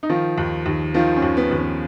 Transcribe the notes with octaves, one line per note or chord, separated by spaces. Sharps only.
D#4
D#3 F3 F4
D#2
D#2
D#3 F3 F4
C#4
D#2
B3
D#2
B3